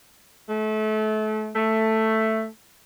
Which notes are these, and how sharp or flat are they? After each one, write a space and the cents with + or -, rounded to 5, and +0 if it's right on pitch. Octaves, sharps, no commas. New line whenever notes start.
A3 -30
A3 +5